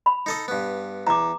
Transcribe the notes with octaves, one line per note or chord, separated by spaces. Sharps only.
B5
D#4 A4 D#5
G2 B3
E2 A#5 D6